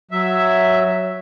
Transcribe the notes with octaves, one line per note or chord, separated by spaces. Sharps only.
F#3 E5